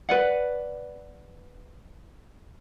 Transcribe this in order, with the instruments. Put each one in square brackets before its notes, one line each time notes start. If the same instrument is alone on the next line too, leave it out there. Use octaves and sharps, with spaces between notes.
[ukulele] B4 D5 F#5